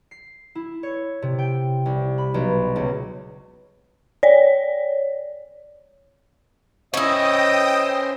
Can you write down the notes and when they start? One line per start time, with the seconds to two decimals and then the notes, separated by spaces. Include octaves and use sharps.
0.11 C7
0.55 E4
0.83 C#5
1.22 C3
1.39 G5
1.86 C2
2.18 B5
2.34 B1
2.76 C#2
4.23 C#5 D5
6.94 C#4 E4 C5 C#5 D#5 G5 D#6